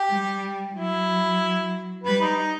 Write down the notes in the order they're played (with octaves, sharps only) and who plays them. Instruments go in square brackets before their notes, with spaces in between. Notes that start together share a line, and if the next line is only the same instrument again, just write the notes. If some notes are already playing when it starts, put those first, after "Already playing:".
Already playing: [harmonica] G4
[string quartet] G3
[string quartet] F#3 [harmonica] E4
[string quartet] G3 [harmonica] B4
[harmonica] D#4
D#4